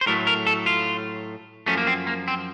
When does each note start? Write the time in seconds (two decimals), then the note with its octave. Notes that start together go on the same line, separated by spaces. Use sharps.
0.01 C5
0.06 A2 F#3 A3 A#4
0.27 A#4
0.47 A4
0.66 F4
1.66 F#2 F3 A3 C#4
1.77 A#3
1.87 C4
2.07 A#3
2.28 C4